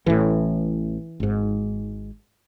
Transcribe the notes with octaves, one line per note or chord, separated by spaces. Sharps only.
A1 A2 E3
G#1 G#2